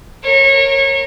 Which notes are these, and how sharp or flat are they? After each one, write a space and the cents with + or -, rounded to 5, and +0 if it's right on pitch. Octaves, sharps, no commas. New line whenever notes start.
A#4 +0 C#5 -25